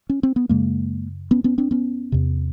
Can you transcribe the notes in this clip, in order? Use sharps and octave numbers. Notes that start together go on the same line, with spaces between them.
C#4
C4
B3
F#2 C#3 G#3 A#3
B3 C#4
B3 C#4
C4 D4
B3 C#4
E2 C3